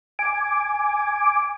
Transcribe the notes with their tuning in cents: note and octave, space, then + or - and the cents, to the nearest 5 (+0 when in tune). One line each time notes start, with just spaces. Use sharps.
G#5 +0 D6 +0